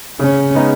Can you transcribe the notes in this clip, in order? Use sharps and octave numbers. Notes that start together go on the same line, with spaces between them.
C#3 C#4
G#3 B3 D#4